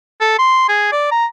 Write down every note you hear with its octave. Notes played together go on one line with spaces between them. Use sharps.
A4
C6
G#4
D5
A#5